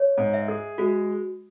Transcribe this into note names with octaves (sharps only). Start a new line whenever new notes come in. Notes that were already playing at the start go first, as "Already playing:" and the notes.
Already playing: C#5
G#2
E5
G#4
G#3 F#4